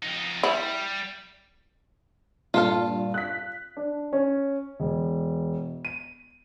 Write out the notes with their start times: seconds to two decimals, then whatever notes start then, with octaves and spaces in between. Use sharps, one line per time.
0.02 F2 D#4
0.43 G3 E4
2.54 G2 A#2 F4 A4 F5
3.14 F#6 B6
3.77 D4
4.13 C#4
4.80 E1
5.85 D#7